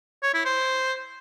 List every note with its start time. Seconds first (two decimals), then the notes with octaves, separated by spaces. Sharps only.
0.23 C#5
0.34 E4
0.45 C5